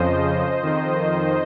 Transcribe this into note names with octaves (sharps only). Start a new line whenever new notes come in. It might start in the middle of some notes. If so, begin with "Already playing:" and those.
Already playing: F2 C#3 F3 C5 D#5
F2 D#3